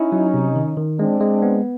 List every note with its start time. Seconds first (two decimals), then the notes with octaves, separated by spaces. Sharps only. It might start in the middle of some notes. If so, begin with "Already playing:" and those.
Already playing: C#4 D#4 E4
0.12 F#3
0.34 C3
0.56 D#3
0.77 D#3
0.99 G#3 C4 D4
1.20 G#3
1.42 B3